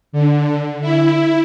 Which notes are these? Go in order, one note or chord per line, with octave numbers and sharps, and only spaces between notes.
D3
E4